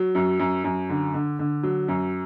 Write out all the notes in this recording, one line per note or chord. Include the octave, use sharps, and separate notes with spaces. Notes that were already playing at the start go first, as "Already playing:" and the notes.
Already playing: F#3
F#2
F#2
F#2
D3
D3
D3
F#3
F#2